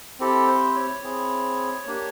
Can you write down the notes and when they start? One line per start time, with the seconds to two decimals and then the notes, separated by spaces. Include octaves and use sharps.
0.20 C4 E4 G4 A4
0.47 C5
0.76 C#5
1.03 C4 E4 G#4
1.86 A#3 D4 G4